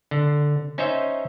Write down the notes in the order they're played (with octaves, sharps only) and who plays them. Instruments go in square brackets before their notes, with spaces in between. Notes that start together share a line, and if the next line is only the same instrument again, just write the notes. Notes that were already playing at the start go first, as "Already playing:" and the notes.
[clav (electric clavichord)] D3
C#4 D#4 C5 C#5 D#5 E5